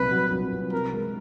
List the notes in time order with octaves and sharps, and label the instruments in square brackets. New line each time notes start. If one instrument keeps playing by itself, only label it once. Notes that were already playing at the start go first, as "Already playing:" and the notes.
Already playing: [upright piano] C2 A#2 F#3 [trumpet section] B4
[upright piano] F#3
C2
C2
[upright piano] C3 [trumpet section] A#4
[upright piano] G#3